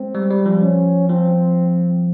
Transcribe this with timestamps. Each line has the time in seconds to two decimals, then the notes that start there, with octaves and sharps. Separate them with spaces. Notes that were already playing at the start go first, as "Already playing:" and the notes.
Already playing: G#3 C4
0.15 G3
0.30 G3
0.46 F3
0.62 C#4
1.09 F3 C4